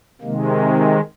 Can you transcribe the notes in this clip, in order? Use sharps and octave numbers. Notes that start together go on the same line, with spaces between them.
C3 D#3 G#3 A#3